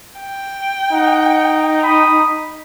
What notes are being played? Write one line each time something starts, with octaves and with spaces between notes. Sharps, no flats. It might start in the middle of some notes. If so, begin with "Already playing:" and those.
G5
D#4 F#5
B5 D#6